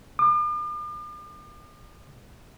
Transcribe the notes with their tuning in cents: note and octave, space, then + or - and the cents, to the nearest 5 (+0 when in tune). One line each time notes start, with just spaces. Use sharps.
D6 +45